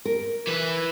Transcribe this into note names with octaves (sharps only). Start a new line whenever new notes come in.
A#4
E3 B4